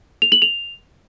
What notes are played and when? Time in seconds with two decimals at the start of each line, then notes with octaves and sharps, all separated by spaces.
0.22 F7
0.32 F#7
0.42 F7